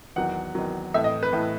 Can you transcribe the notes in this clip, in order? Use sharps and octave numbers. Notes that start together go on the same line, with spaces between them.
E2 D#3 F#3 F#5
E2 D#3 F#3
A2 E3 A3 E5
D#5
B4
A2 E3 A3